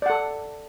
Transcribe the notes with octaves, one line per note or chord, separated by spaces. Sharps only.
A4 D5 F#5